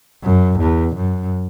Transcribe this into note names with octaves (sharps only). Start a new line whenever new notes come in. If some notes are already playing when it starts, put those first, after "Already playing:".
F#2
E2
F#2